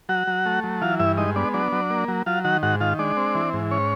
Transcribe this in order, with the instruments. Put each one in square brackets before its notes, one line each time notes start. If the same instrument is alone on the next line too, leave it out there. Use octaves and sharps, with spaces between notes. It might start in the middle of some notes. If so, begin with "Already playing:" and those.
[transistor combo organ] F#3 F#4 F#5
F#3
A3
F#3
E3 F4 F5
G2 E4 E5
G#3 D#4 D#5
B3 D4 D5
F#3 D4 D5
F#3
A#3
F#3
F#3 F4 F5
D#3 F#4 F#5
G#2 F#4 F#5
D#3 F4 F5
G#3 D4 D5
C4
E3
G#2
C#4 C#5